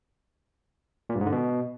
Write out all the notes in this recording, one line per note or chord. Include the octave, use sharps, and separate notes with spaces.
A#2
G2
G#2
D3
B2